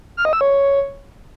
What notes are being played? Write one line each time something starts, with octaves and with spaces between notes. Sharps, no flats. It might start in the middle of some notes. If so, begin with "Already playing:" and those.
F6
D#5
E6
C#5